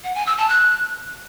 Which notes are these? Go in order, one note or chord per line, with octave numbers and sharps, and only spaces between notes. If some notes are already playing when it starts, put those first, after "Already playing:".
F#5
G#5
E6
A5
F#6